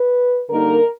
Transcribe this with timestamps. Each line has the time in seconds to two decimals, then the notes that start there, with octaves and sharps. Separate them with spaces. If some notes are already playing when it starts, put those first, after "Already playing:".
Already playing: B4
0.49 D3 G3 A#3 D#4 A#4